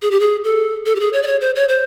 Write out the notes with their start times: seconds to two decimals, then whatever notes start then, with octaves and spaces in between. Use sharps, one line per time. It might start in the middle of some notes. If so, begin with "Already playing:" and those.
0.02 G#4
0.11 G4
0.20 G#4
0.44 A4
0.86 A4
0.95 G4
1.00 G#4
1.13 C#5
1.23 D5
1.27 C#5
1.41 C5
1.56 C#5
1.69 C5